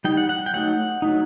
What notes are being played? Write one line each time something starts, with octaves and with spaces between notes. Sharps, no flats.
G3 D#4 G5
F#5
F#5
G5
F#3 A3 D#4 F#5
F#3 A3 D#4